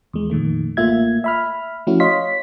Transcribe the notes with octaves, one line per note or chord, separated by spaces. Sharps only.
E2 G#3
F2 A#2 D#3 A3
A1 A3 A#3 F4 E5 G#6
E5 B5 F6
F3 A3 C#4 E4 F#4
C#5 D#5 F5 C6 B6